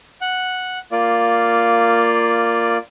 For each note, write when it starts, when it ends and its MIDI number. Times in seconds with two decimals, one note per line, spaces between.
0.21 0.79 78
0.92 2.77 58
0.92 2.77 65
0.92 2.77 74